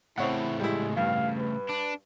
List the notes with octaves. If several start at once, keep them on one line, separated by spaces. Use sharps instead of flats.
A2 C#3 C4 E4 C#5 F#5
G3 G#3 E4
G2 F5
B4
D4